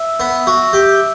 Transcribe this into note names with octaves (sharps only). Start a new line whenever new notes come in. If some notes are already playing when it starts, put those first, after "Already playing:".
Already playing: E5
B3
F#4
G4